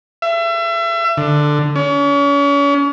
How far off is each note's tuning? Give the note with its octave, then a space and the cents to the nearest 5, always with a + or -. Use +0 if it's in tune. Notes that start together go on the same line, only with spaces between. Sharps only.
E5 +35
D3 +10
C#4 +40